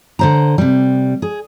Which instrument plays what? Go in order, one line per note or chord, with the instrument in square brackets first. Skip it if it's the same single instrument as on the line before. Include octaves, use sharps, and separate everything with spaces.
[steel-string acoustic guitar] D3 C5 A#5
C3 G3
G#4